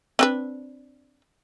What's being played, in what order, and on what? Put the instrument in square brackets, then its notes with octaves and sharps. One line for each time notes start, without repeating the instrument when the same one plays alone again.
[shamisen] C4 D4 B4